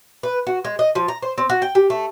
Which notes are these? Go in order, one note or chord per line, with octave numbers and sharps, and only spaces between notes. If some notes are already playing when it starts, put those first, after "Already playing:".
B4
F#4
G#3
D#5
F3
A#5
C5
C4
F#4
G5
G4
A3